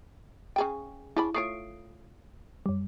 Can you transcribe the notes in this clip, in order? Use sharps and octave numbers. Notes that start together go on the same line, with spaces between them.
C#3 G#4 G5
C#3 D4 E4 B5
A3 F4 C#5 D#6 C7 D7
F#2 G3